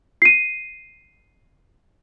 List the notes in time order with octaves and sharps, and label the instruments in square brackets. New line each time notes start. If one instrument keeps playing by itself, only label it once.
[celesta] C7 D#7